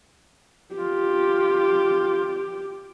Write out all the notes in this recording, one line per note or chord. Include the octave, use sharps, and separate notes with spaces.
F4 G4